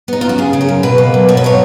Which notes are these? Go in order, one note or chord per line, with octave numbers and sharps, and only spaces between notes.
B3 D#4
F#2 F4
F#4
C#3 G#4
C#3
A#4
F#2
B2 B4
A#3
F#3
B2 C#5
B4
F#3 C#5